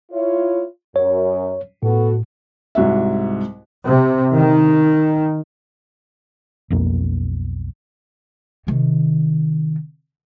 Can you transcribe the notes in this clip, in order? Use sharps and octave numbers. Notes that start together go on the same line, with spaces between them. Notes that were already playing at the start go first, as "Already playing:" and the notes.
E4 F4 C#5
F#2 C#5
A2 B3 F#4 A4
C2 G#2 F#4 E5
C3
D#3
B1 F2 A#3
C3 D#3